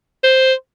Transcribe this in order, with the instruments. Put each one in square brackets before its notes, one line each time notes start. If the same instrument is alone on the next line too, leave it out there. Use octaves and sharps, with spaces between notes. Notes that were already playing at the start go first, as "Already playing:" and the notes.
[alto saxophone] C5